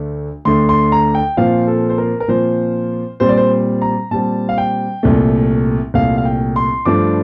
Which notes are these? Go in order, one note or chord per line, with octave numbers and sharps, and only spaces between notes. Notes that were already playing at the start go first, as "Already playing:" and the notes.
Already playing: D2 D3 A3 D4
D2 D3 A3 D4 C6
C6
A#5
G5
A#2 F3 C4 F5
A4
C5
A#4
A#4
A#2 F3 C4 C5
A#2 G3 C4 C5
D5
C5
A#5
A#2 G3 C4 A5
F5
G5
C2 A#2 A3
C2 A#2 A3 F5
F5
G5
C6
G2 F3 A3 D4 D6